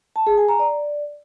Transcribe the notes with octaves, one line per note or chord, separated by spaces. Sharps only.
A5
G#4
G#5
A#5
D5